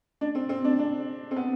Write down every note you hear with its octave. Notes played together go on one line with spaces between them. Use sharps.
D4
C4
C4
D4
D4
C4
B3